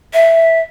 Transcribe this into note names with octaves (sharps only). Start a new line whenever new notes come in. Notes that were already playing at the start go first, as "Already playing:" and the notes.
E5